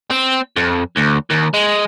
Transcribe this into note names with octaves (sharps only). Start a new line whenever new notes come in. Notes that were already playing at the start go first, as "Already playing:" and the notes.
C4
F2
D2
D#2
G#3